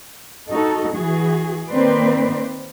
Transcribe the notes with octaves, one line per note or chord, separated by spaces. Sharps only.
D#4 F#4 A4
E3 F#4 G#4
D#3 A#3 C4 B4 C5 D5